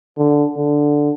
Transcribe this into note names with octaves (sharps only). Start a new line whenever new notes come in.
D3
D3